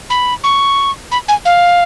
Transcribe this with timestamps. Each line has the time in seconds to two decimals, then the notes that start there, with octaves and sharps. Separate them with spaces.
0.10 B5
0.44 C#6
1.12 B5
1.28 G#5
1.45 F5